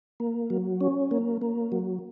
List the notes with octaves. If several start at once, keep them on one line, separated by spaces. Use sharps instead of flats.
A#3
F#3
C#4
A#3
A#3
F#3